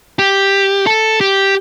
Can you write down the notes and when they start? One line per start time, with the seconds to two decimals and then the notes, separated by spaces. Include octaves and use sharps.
0.19 G4
0.87 A4
1.21 G4